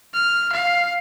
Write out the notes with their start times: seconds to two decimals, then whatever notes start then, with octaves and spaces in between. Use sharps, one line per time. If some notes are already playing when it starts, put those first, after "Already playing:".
0.14 F6
0.52 F5